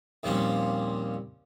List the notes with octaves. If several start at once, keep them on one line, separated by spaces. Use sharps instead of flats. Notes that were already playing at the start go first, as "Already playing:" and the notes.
D#2 A#2 F3 G3 C4 C#4